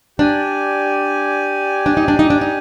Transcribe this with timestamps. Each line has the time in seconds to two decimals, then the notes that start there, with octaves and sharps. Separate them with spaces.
0.19 D4 G4 D5 G#5
1.86 D4
1.97 D#4
2.08 D4
2.19 D#4
2.30 D4
2.41 D#4